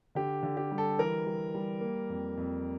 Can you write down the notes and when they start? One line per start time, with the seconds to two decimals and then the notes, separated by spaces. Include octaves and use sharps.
0.15 D3 G4
0.43 D3
0.57 G4
0.72 G3
0.78 A4
0.98 E3 A#4
1.26 G3
1.54 G3
1.81 A#3
2.10 F2
2.37 F2